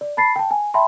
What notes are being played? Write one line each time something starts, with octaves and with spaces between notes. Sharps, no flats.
D5
A5 B5 A6 C7
G5 A5
G#5
E5 G5 A5 B5 C6